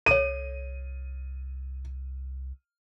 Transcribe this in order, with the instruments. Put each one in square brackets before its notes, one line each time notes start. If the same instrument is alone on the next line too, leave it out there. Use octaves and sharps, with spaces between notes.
[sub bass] C2 [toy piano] A4 C#5 [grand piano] D#7